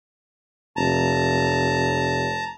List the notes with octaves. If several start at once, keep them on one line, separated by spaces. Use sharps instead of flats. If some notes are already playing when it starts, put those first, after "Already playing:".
F1 A5 A#5